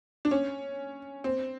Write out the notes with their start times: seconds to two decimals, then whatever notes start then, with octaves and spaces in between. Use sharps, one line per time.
0.25 D4
0.31 C#4
1.24 C4